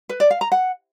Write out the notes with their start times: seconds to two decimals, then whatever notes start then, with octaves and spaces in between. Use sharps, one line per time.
0.09 B4
0.20 D5
0.31 F5
0.41 A#5
0.52 F#5